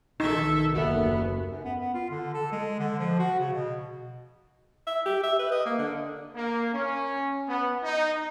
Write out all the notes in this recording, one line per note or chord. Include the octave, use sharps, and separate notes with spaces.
B1 D#3 D#4 A4 E5
F#1 D#2 B3 F#4 A4 E5
F#2
B3
B3
F4
D3
A4
G#3
D3
F3
F#4
C#3
B2
E5
G4
E5
B4
D#5
A#3
D3
A#3
C#4
B3
D#4